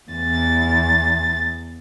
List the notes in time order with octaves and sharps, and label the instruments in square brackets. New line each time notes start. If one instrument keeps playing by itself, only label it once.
[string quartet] E2 A6